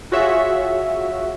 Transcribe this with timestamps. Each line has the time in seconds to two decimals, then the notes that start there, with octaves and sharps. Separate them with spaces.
0.12 F4 F#4 G#4 C#5 E5